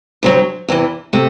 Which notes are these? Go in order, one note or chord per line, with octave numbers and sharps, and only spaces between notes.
D2 C3 F#3
E2 C3 E3
C3 A3